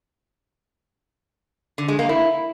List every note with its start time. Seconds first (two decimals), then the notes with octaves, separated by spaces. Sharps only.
1.78 D3
1.88 G#3
1.99 A#3
2.09 E4